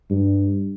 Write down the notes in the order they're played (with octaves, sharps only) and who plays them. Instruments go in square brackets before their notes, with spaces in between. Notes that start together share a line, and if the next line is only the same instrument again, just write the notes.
[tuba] G2